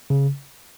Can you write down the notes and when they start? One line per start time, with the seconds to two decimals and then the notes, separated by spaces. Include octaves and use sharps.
0.10 C#3